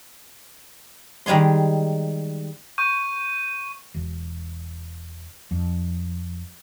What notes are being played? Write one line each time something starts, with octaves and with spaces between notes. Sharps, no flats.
D#3 G3 G#3 G#4 C6
C#6 G6 D#7
E1
F2